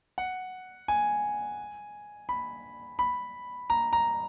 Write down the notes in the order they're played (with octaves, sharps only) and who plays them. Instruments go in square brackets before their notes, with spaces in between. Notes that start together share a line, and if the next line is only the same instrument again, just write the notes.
[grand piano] F#5
G#5
B5
B5
A#5
A#5